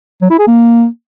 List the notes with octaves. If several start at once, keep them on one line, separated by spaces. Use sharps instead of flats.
F#3
E4
G#4
A#3